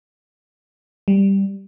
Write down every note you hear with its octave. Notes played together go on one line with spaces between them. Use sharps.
G3